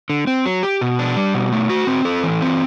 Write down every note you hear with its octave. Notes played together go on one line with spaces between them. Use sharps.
D3
C4
F#3
G4
B2
D4
G3
B2
A3
F#4
C4
A4
E3
C4